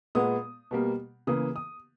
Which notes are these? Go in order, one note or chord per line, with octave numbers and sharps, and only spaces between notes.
A#2 G#3 B3 D#6
B2 G3 A#3
C#3 E3 A#3 D#6
D#6